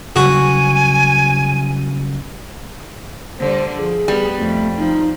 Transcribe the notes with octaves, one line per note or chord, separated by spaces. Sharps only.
C#3 F#3 G3 F#4 G#5
D3 G3 C5
F3 G#4
G3 B3
F2 A3
F3 D#4